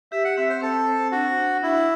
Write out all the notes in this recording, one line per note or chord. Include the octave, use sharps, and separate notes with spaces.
G4 E5
F#5
C4 E5
C5
C4 A4
C5
D4 F#4
D4
D4 E4